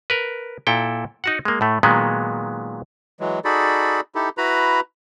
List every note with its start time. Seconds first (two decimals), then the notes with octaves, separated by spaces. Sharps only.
0.10 A#4 B4
0.67 A#2 E4 A4 G5
1.24 D#4 F#4 F#5
1.45 G#3 A#3
1.61 A2 A3
1.83 A#2 D#3 F#3 G#3 B3
3.20 E3 F#3 G#3
3.45 D#4 F#4 G#4 A4 D5 B5
4.15 D#4 E4 G4 A4
4.38 E4 F#4 B4 A#5 B5